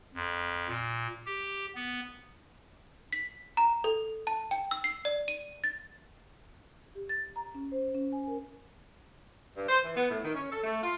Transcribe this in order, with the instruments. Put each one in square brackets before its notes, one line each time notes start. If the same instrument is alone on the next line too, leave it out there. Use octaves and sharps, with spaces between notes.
[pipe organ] F2
A#2
G4
B3
[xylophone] B6
A#5
A4
A5
G5
E6
C7
D5
D#7
A6
[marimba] G4
A6
A#5
C#4
C5
C#4
G#5
A#4
[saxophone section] G2
C5
E3
B3
A2
D#3
C#4
A4
A3
F4